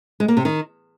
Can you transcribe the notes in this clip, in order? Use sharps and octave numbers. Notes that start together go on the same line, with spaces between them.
G#3
A#3
C3
D#3